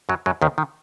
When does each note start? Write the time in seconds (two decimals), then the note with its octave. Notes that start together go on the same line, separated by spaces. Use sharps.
0.09 F#2 F#3
0.26 F#2 F#3
0.42 D#2 D#3
0.58 D#3